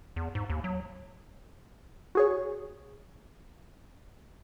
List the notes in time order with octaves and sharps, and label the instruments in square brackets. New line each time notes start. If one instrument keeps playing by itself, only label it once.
[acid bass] E2
G#2
D#2
F#3
[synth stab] F#4 G#4 C#5